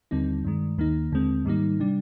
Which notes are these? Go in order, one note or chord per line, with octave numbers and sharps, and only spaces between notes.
D#2 D3 G3 C4 D#4
G2 D#3 G#3
D#2 D#3 A#3 D#4
D#2 D3 G#3 C4
G#2 D#3 G3 A#3 D#4
C3 G3 D4